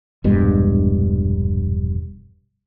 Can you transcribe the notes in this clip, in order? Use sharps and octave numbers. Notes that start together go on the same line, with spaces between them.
E1 A#1 G2 G#3